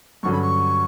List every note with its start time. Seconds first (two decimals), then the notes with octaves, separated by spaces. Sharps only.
0.23 G2 D3 F#3 C#4 C#6
0.32 B5
0.42 C#6